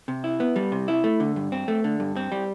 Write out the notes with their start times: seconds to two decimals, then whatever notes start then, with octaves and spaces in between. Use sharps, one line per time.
0.08 C3
0.24 E4
0.40 B3
0.56 G3
0.72 C3
0.88 E4
1.04 A3
1.20 D3
1.36 G2
1.52 C4
1.68 A3
1.84 D3
2.00 G2
2.16 C4
2.32 G3